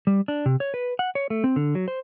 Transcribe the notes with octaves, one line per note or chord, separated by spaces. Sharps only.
G3
D4
C3
C#5
B4
F#5
C#5
A3
C4
D3
F#3
C5